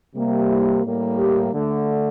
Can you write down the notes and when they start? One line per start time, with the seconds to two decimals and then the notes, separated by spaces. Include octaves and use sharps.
0.14 C3 G3 A#3
0.49 E4
0.83 A2 G3 A#3
1.18 G4
1.52 D3 A3